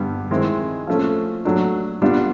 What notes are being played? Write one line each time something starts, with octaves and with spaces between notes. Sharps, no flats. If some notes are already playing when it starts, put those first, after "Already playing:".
Already playing: G2 D3 G3 B3
D#3 G#3 C4 E4
F3 A3 C#4
F#3 A3 D4
G3 B3 D4 F4